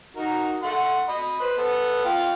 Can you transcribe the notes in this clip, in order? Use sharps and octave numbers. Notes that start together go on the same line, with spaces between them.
D#4 F#4 A#4
A3 F#5 C6
D#5 B5
B4 C5
B3 A4 B4
F4 F5 G5